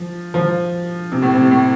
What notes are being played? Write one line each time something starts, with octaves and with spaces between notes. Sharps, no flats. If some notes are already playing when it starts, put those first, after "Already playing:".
Already playing: F3
F3
C3
A2
C3
A2